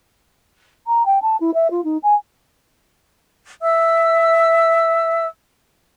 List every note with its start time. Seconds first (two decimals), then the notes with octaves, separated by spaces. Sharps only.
0.87 A#5
1.05 G5
1.22 A5
1.40 E4
1.54 E5
1.71 F4
1.84 D#4
2.03 G#5
3.62 E5 E6